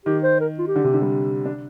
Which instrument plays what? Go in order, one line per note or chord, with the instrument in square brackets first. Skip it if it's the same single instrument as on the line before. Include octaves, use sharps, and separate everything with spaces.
[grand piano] D#3 [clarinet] G4
[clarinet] C5
A#4
F4
G4
[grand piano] D3
C3
D3
G3
D4